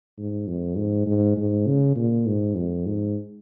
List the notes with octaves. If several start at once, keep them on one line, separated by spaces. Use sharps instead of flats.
G#2
F2
G#2
G#2
G#2
C#3
A#2
G#2
F2
G#2